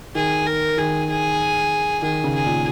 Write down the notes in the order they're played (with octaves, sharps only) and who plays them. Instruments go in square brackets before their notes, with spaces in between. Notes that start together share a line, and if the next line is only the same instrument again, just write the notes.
[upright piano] D#3 [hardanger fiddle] G#4
[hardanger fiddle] A#4
[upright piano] D#3 [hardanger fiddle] G#4
[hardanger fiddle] G#4
[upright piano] D#3 [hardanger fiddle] G#4
[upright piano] C#3
[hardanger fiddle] G#4
[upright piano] A#2